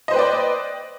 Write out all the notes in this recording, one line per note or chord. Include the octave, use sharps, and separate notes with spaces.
B4 C5 D5 D#5 G5